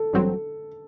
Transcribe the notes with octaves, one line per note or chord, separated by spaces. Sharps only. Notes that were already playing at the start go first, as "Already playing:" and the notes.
Already playing: A4
A1 G2 F#3 C4